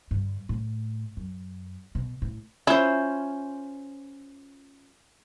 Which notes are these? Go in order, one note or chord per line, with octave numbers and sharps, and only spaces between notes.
G2 D3
A2
F#2
B2
A2
C#4 E4 F4 C5